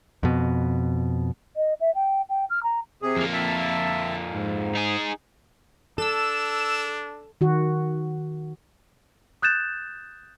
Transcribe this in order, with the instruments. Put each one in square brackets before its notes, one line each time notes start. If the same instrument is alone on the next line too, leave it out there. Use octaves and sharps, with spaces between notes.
[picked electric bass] F2 B2
[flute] D#5
E5
G5
G5
F6
A#5
[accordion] C3 G#4
[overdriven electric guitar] F2 A#3
[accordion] E5 A5
G#2
[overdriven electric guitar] D#4 G#4
[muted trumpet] D4 [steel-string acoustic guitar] A4 [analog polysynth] E6 E7
[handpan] D#3 F#4
[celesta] D#6 F#6 G6 A6 E7